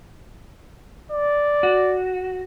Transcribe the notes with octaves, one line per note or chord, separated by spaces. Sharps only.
D5
F#4